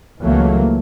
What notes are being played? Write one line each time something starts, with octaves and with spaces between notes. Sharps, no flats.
C#2 E3 F#3 A3 A#3